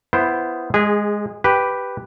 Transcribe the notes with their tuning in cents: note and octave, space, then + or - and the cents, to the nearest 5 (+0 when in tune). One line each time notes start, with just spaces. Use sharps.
B3 +5 E4 +20 C5 +0
G#3 +0 G#4 -25
G4 +0 B4 +0